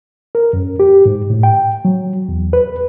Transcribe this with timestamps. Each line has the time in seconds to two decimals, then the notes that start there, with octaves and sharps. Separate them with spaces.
0.35 A#4
0.53 F#2
0.80 G4
1.06 G#2
1.30 A2
1.43 G5
1.85 F#3
2.29 E2
2.53 B4